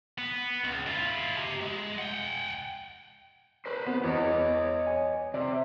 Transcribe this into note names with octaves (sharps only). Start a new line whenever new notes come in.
B3
C#2
E4 F4
G4 A#5
G#3
F#5 G5
B4 C5
B3
E2 C#5 D#5
G#5
C3 D5